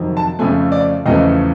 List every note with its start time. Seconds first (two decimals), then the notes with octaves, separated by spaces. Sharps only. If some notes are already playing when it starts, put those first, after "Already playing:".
Already playing: F2 C3 D#3 F#3
0.17 A5
0.39 F2 C#3 F3 A3 G#5
0.72 D5
1.06 E2 C#3 F3 A3 D#5